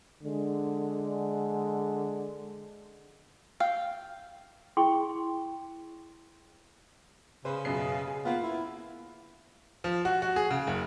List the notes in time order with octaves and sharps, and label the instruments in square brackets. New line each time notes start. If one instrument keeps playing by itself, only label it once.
[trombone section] D3 G#3
[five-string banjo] F5 G5
[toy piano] E4 G#4 G5 C6 C#6
[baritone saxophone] C#3 [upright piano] B4 C5
[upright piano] F#2 B2 C7
G#4
[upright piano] A#3 F4 [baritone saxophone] B3
[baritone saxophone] E4
[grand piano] F3
F#4
F#4
G#4
C#3
F#1